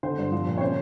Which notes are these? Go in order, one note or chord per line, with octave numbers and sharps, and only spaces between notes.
D3 C5
G2
F3
A#2
C#5
C#3 C5